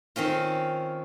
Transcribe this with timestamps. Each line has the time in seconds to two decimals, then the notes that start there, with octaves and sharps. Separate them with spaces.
0.16 D#3 C4 C#4 F4